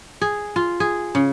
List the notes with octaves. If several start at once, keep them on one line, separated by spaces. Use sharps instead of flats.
G#4
F4
G#4
C#3